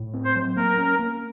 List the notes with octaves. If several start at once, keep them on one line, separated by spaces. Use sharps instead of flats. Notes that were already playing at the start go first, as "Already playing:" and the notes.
Already playing: A2
C4
C5
F#3
A#3 A#4
C#4
A#3